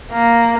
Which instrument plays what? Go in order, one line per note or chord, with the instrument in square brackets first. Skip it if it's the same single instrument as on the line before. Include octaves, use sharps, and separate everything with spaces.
[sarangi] A#3